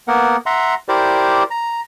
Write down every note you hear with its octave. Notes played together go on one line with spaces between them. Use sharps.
A#3 B3 A#4 F#5
E5 F#5 A#5 C6
E4 G4 A#4 C5 D5
A#5